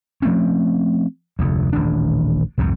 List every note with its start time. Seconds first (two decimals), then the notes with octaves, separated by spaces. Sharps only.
0.22 F3 A3 C4 C#4
1.39 F1 D2
1.73 D#1 A1 D#3 D4
2.58 C2 F2 G#2 C3